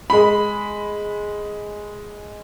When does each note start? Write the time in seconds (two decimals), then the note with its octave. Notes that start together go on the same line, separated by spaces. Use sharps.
0.10 G#3 B5